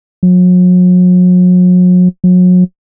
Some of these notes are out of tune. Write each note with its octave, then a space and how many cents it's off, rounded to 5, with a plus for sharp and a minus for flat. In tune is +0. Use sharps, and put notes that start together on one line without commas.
F#3 -40
F#3 -35